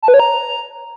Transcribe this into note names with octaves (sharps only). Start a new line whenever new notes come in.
A5
B4
C#5
A#5